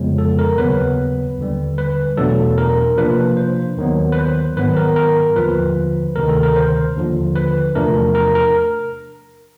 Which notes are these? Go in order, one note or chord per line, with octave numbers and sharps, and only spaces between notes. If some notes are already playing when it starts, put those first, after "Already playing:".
Already playing: F2 C#3 F3 G#3 B3
A4
A#4
D#2 C#3 F#3 B3 B4
D#2 D3 G3
B4
E2 B2 F#3 A3 D4 A4
A#4
C3 F3 A#3 D4 B4
C5
D#2 D#3 F#3 B3
B4
C5
G#2 D#3 F#3 B3 B4
A#4
A#4
D#2 D3 F3 B4
D2 C3 D#3 A#4
A4
A#4
C5
D#2 D3 F3
B4
E2 C3 F3 A3 D4 A#4
A#4
A#4